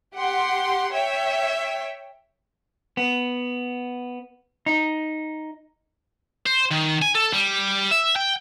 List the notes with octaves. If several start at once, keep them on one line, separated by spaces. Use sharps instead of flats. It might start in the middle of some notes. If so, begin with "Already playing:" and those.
G4 F#5 C6
C#5 E5 G5
B3
D#4
C5
D#3
G#5
A4
G3
E5
G5